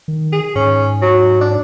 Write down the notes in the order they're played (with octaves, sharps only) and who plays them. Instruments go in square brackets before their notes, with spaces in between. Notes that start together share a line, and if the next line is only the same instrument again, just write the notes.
[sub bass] D#3
[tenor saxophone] G#4
[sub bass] G#2 [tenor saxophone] C#4
[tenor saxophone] F#3
D4